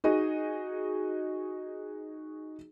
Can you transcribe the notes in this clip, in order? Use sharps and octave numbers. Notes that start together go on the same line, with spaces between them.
D#4 F#4 G#4 D#5